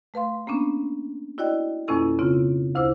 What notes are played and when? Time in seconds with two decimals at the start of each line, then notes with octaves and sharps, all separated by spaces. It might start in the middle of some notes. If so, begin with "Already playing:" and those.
0.14 A3 B4 F5 C6
0.47 A#3 B3 C#4 D4
1.38 E4 F#4 D5 D#5 G5
1.88 F2 B2 A#3 C#4 E4 A4
2.19 C#3 C4 F4
2.75 D2 E4 C5 D6 E6